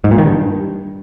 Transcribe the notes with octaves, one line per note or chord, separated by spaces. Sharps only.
G#2
A#2
D#3
G2